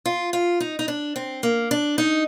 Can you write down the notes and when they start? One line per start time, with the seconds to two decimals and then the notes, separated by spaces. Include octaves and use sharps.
0.06 F4
0.33 F4
0.60 D#4
0.79 D#4
0.88 D4
1.16 C4
1.43 A#3
1.71 D4
1.98 D#4